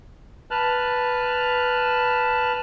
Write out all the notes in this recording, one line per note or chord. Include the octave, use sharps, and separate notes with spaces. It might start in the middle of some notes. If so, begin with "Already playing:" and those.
B4 A5 F6 F#6